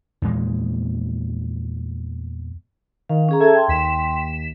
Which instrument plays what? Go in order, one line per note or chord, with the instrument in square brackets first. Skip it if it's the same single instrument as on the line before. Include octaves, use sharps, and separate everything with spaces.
[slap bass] E2 A#2 G#3 A#3
[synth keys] D#3 [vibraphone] F5
[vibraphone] C#4 G#4 A#5
[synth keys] A4 G#6 [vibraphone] E5 A5
[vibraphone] G5 C6
[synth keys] D#2 B6 E7